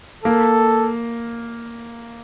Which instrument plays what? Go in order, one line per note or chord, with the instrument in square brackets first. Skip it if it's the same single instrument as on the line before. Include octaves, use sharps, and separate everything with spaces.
[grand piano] A#3 [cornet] A4